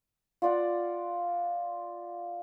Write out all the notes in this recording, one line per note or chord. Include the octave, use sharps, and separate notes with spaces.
F4 D5 F#5